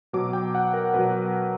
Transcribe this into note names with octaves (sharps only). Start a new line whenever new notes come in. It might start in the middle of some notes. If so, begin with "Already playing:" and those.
B2 F#3 D6
G5
F#5
A#4
B2 F#3 B4